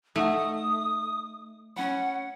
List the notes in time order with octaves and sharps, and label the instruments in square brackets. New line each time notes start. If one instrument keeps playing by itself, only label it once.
[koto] A3 [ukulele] D#4 F#5 [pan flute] D#6
[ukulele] C#4 B5 [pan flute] F#5